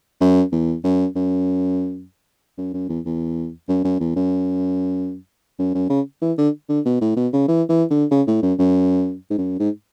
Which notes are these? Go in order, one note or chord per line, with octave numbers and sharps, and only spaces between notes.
F#2
E2
F#2
F#2
F#2
F#2
E2
E2
F#2
F#2
E2
F#2
F#2
F#2
C#3
E3
D3
D3
B2
A2
B2
C#3
E3
E3
D3
C#3
A2
F#2
F#2
G#2
F#2
G#2